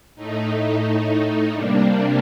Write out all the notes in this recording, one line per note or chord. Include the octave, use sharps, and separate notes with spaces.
A2 A3 D#4
C3 G3 A#3 D4